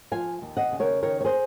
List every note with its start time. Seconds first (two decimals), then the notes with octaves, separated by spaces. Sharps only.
0.11 F3 F5 G#5
0.42 D#2
0.57 D#5 F#5
0.72 C#3
0.80 A#4 C#5
1.02 D#3 A#4 C#5
1.21 C#5
1.25 G#4 C5